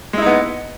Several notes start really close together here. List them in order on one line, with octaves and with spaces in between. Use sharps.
G#3 E4 D#4 B3